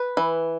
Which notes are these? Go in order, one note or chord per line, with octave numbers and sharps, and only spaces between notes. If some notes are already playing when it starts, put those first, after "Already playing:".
Already playing: B4
E3